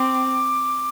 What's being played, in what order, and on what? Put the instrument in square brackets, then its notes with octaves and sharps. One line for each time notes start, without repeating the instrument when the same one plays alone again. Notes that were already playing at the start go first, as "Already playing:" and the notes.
Already playing: [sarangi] C4 [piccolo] D6